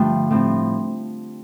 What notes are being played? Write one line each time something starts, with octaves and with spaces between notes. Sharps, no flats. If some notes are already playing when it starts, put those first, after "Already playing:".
Already playing: G2 D3 F3 A3 D4 G5
A2 F3 C4